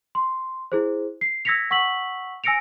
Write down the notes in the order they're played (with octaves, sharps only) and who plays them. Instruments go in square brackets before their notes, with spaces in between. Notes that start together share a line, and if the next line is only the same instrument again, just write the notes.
[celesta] C6
E4 G#4 C5
C7
E6 G#6 A#6 B6 C#7 F7
F#5 C#6 E6 B6 F#7
G#5 E6 A#6 C#7 D7 F7